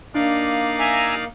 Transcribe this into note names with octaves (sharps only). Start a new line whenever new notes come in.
A#3 D4 D#4 D5 F5
E5 G#5 A#5